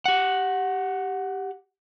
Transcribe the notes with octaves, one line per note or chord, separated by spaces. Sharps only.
G4 F#5